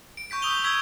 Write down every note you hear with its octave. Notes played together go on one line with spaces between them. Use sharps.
D7
C#6 G6 B6 D7
D#6 E6 G6 F7 G7
C#6 D#6 E6 G#6 B6 G7